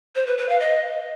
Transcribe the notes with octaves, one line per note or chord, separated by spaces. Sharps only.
C5
B4
B4
F5
D#5